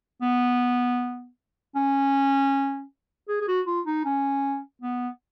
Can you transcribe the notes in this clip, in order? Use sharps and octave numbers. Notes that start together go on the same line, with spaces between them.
B3
C#4
G#4
G#4
F#4
F4
D#4
C#4
B3